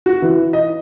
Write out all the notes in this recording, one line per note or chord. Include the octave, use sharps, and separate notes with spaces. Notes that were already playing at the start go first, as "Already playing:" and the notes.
F#4
E3
D#5